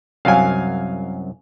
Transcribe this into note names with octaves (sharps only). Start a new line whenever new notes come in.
C2 F#2 F#3 F5 G#5